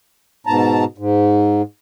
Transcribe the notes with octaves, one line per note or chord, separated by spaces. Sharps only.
G#2 B2 A5 A#5
G#2